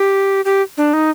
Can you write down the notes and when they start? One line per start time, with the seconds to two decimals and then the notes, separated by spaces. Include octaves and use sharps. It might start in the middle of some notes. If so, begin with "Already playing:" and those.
Already playing: G4
0.45 G4
0.77 D4
0.93 D#4